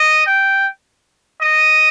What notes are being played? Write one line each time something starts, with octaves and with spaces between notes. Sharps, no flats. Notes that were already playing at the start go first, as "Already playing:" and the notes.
Already playing: D#5
G5
D#5